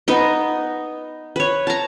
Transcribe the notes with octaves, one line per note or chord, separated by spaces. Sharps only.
B3 D#4 D#5
B4 C#5
A5 A#5